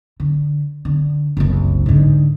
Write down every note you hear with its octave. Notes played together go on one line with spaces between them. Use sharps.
D3
D3
F#1 C2
G#2 D3